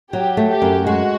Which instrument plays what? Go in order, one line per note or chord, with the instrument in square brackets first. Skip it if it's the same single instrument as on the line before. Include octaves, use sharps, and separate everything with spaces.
[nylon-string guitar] F#3 [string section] G4
[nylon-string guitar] A3
[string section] G4
[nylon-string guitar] F#2
[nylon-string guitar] G#3 [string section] F#4